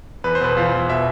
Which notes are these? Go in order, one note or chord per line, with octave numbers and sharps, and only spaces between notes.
E2 B4
C5
B2 B4
E2 F4
E2
B2 E5